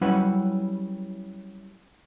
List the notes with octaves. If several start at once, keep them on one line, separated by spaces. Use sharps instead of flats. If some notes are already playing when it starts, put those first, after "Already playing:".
F#3 G3 C#4 E4 B4 F#5